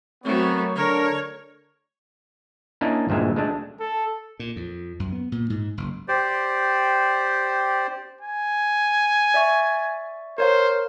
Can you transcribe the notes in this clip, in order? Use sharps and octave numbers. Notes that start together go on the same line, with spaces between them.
F#3 A3 B3 C4 A#4 C#5
D3 A#4 C#5
A#3 C#4 D4 E4 D#5
D2 G2 A#2 G#3 E5
G#3 A3 D4
A4
A#2
F2
F#2
B3
A#2
G#2
F#1
G4 C5 D5
G#5
D5 E5 C#6
A#4 C5 C#5 F5